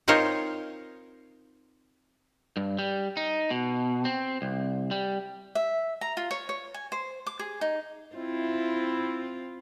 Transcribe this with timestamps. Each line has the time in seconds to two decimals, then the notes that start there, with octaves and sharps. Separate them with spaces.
0.08 C4 D#4 F4 A#4 C5 C#5
2.57 G2
2.79 G3
3.17 D#4
3.50 B2
4.05 C4
4.42 C2
4.91 G3
5.55 E5
6.01 A#5
6.17 F4
6.31 C#5
6.49 C#5
6.74 G#5
6.92 C5
7.27 D6
7.39 G#4
7.61 D#4
8.16 C4 E4 F4